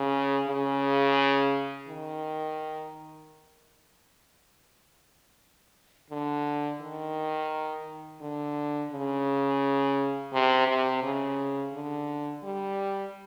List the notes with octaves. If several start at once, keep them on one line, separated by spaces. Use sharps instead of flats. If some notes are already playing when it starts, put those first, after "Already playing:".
Already playing: C#3
C#3
D#3
D3
D#3
D3
C#3
C3
C3
C#3
D3
G3